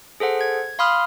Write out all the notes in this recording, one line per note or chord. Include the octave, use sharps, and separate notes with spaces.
G#4 A4 C5 F#5
G#6
F5 B5 C6 D#6 F6